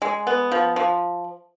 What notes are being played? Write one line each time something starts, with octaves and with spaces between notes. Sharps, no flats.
G#3
B3
F3
F3